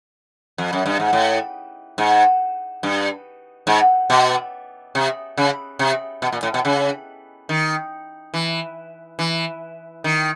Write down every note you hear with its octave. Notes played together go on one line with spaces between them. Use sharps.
F2
F#2
G2
G#2
A2
G#2
G2
G#2
B2
C3
C#3
C3
B2
A#2
A2
B2
C#3
D#3
E3
E3
D#3